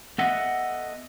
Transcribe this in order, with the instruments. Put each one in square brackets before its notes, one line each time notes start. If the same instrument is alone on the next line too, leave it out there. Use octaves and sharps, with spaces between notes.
[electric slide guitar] B3 A4 D#5 E5 F#5